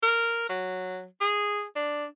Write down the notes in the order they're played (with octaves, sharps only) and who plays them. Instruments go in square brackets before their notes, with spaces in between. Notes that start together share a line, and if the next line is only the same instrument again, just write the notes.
[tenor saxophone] A#4
F#3
G#4
D4